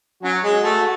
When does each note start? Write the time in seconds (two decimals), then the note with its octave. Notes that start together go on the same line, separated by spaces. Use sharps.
0.23 F#3 C#4 F#4
0.44 G#3 G#4
0.53 F#4
0.63 A3 A4